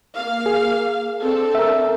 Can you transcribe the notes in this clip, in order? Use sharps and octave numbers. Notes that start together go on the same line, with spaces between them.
A#3 F5
G#4
C4 D4 A4
A#4 E5